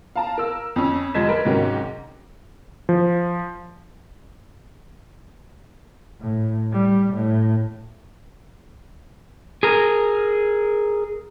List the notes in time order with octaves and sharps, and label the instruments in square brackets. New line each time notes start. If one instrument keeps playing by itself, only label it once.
[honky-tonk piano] F5 A5 A#5
A#4 E6
F2 C#4
F1 F3 G#3 G#6 B6 E7
A#4 B4
G#2 C3 D#3 F#3 C#4
[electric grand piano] F3
[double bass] A2
G3
A2
[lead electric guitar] G#4 A#4